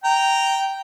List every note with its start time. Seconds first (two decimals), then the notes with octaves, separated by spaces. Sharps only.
0.04 G5 A#5